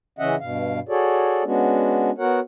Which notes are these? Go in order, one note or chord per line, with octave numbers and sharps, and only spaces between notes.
C#3 E3 C#4 D#5 E5 F#5
G2 B2 F5
F#4 G#4 A4 C#5 D5
G#3 B3 C#4 D4 F#4
B3 F#4 A#4 C#5 F#5